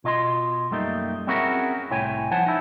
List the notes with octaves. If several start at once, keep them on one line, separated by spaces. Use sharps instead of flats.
B2 F4 D#5 A#5 C6
F#2 G3 A3 A#3 D#4
C4 C#4 E4 F#4 G#4 A#4
C2 A2 E4 C#5 G5 G#5
F3 E4 C5 F#5 A5
D#4 E4